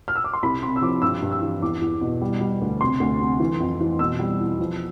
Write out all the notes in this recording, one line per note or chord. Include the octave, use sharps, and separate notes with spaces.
F6
E6
D6
C6
C2 B5
C3 C6
E6
F3 D6
G2 E6
G2
E6
E3
E2 D6
E2
B2
G3
G3
D2
C3 C6
D2
C3
E3
F2
E3
B2 E6
G3
E2
F3